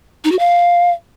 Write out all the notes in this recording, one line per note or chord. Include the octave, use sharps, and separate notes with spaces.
D#4
F#4
F5